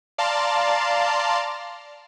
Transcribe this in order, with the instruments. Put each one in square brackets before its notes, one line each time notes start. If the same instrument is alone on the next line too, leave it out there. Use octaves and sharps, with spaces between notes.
[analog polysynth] D5 F5 A5 A#5 C6